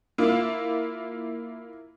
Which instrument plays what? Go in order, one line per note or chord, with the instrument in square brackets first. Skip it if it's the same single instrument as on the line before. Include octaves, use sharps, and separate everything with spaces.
[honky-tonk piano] A#3 E4 F4